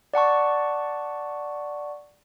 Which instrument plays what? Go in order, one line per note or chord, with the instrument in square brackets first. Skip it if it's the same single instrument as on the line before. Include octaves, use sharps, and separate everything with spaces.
[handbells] D5 F#5 A5 C#6